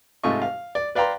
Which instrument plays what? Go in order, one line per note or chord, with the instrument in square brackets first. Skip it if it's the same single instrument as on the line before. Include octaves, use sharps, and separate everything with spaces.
[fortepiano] G#2 C3 A3 F4 D#5 C#6
F5
D5
B4 D5 F5 G5 A#5 C6